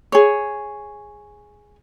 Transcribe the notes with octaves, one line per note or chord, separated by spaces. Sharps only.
G#4 C#5